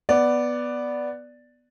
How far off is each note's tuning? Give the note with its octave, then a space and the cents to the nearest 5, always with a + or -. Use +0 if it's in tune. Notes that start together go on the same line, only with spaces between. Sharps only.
B3 +0 D5 +0